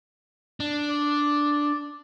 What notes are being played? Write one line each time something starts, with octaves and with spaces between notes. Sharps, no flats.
D4
D5